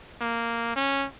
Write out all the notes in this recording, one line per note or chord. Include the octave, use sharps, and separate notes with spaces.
A#3
C#4